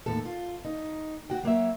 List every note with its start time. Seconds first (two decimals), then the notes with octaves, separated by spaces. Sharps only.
0.06 D#2 A2 A4
0.25 F4
0.65 D#4
1.30 F#4 G5
1.43 F#3 A#3 C#5 E5